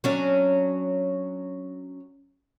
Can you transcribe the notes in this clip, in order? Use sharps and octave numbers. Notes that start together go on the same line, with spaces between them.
F#3 C#4 D4